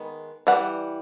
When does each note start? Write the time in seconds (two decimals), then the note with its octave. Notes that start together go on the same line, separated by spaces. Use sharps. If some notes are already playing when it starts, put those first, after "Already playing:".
Already playing: D#3 G#3 B3
0.47 E3 G3 F#5